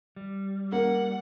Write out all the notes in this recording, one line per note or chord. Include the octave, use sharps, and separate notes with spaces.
G3
A#3 F#5